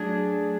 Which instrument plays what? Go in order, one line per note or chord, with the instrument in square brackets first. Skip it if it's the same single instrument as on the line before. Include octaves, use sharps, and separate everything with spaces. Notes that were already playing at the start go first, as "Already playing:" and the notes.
Already playing: [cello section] F#3 A3 D4 G#4